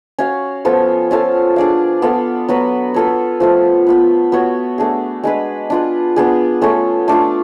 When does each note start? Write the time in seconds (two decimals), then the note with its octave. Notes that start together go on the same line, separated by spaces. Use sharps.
0.19 C#4 F#4 C#5 F5
0.65 F3 B3 F4 A4
1.11 C#4 F4 A4 F5
1.56 D4 G#4 D5 F5
2.02 B3 F4 A4 F5
2.48 F#3 B3 F#4 B4
2.94 B3 F4 A4 C#5
3.40 F3 A3 F4
3.87 B3 F4 B4
4.32 B3 F#4 C#5
4.78 A3 D4 G#4
5.23 G#3 D4 G#4 B4
5.70 D4 F4 B4
6.16 B3 D4 G#4
6.62 A3 C#4 F4 A4
7.08 A3 D4 F4